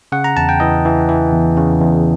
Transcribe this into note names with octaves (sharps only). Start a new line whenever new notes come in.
C#3 F#5
A#5
E2 A5
G5
E3 D#5
E3
E3
E2
C#3
E2